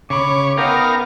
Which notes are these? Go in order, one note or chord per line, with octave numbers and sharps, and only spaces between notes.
C#3 C#5 B5 D6
B3 D#4 A#4 B4 F5 G5